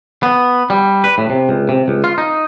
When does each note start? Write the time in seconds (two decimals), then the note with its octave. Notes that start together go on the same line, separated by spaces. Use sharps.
0.23 B3
0.70 G3
1.04 B4
1.18 A2
1.30 C3
1.49 C#2
1.69 C3
1.88 C#2
2.04 F4
2.18 D#4